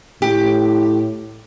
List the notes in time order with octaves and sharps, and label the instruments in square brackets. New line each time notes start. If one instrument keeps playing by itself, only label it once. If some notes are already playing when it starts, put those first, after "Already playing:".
[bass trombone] A2 [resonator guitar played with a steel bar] G4